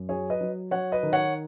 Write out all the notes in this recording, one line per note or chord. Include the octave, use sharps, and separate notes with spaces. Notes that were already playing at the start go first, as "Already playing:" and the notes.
Already playing: F#2
F#3 G#4 C#5
B4 D#5
F#3
F#3 C#5 F#5
B4 D#5
D#3
C#5 F#5